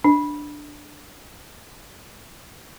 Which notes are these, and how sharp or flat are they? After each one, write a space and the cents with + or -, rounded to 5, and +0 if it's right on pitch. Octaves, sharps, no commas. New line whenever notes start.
D4 +5